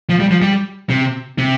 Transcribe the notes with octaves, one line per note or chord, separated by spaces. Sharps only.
F3
G3
F3
G3
C3
C3